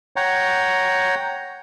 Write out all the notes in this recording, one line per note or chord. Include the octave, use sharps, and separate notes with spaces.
C#5 F#5 G5 A#5